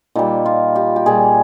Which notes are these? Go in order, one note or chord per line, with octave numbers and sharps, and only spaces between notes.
A#2 G3 D#4
F4
G4
G4
A#2 G3 G#4